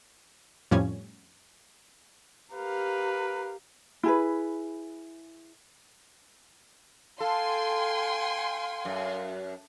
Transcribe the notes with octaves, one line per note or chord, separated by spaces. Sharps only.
F2 A2 F3 G3 C#4 G#6
G4 A#4 B4 F5
E4 G#4 B4
A4 F5 G5 G#5 C6
F#2